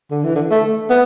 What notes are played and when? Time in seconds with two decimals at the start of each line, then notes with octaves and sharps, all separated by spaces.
0.11 D3
0.24 E3
0.35 D3
0.51 A3
0.90 B3